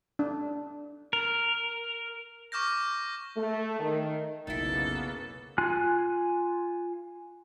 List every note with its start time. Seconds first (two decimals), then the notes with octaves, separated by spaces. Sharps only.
0.19 D4
1.13 A#4
2.52 C#6 D6 F6 G6 A#6
3.36 A3
3.79 D#3
4.47 F1 B1 C#3 A#3 B3 D#4 E4 A4
5.58 F4 G#5 F#6